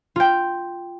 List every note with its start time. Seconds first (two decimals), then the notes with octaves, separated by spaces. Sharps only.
0.16 F4 G5